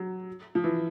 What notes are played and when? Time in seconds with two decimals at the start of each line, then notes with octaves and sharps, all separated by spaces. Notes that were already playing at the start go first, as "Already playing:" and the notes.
Already playing: F#3
0.55 F3
0.64 E3